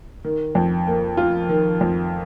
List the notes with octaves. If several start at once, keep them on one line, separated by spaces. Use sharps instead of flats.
D#3
F2
A#3
F4
D#3
F2